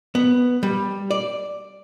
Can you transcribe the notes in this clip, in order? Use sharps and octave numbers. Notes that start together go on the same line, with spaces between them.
B3
G3
D5